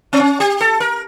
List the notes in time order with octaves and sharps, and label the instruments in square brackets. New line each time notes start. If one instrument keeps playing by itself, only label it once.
[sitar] C4
C#4
G4
A4
A#4